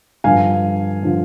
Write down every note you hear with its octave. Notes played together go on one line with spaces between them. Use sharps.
G2 D3 F3 F5 G#5
D3 F3